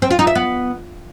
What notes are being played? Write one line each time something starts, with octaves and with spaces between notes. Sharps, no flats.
C4
F4
D#4
E5
B3